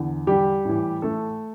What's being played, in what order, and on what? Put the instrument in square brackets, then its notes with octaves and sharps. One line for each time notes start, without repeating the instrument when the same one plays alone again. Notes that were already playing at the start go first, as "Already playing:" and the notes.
Already playing: [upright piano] E2 D3
G3 G4
A2 E3
A3 A4